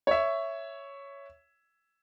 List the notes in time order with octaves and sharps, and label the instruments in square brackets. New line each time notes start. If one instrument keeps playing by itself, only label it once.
[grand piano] C#5 E5